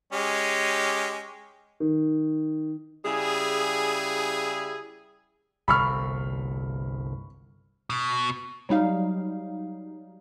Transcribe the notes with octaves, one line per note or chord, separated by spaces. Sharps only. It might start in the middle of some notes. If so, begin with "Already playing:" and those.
G#3 C#4 G4
D#3
C#3 G3 E4 G#4
G1 C2 C3 B5 C#6 F6
B2
F#3 G3 D#4 F5